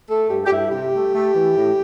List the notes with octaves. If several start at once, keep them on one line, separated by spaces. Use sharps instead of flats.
A3 A4
G2 G4
G4
G2 E4
C3 G4
A3
A3
E3
A2